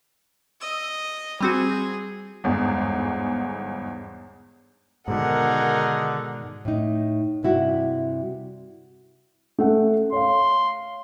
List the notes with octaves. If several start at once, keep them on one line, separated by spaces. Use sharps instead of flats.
D#5 E6
G3 C4 F#4 G#4
G1 E2 G#2
G#2 B2 D3 D#3 D#4 G#4 A#4 F#5
A2 D#4
G2 C3 E4 F#4
A3 C#4 F#5
C#5 F5 C6